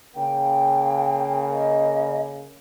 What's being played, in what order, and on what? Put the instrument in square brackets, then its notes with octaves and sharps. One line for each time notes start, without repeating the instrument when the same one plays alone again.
[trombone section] C#3 A#3 [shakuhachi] G5
[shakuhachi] D#5